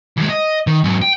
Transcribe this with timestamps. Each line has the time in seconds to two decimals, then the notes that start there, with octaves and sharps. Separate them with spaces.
0.17 D#2 G#3
0.29 D#5
0.67 D#3
0.84 G#2 F#3
1.01 G5